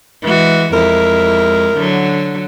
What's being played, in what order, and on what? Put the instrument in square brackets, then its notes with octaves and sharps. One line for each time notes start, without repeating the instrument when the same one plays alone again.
[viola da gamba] E3 G#3 F#4
[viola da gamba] F2 G#3 E4 [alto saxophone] A#4
[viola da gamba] D3 F#3